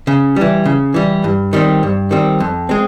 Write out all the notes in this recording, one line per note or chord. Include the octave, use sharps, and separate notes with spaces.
C#3
E3 G3
C#3
E3 G3
G2
D#3 G3 C4
G2
D#3 G3 C4
F2
G#3 C4